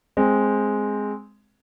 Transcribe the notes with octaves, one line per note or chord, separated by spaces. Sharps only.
G#3 C4